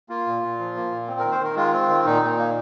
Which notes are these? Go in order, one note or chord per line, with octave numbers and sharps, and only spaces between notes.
A#3 F4
A#2
A#2
F3
A#3
A#2
C4
D#3 A#4
C5
D#3 A#4
G#3 F4
C4
D#3
A#2 D#4
A#2
A#3